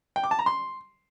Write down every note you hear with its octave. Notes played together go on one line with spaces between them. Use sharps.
G5
D6
A5
A#5
C6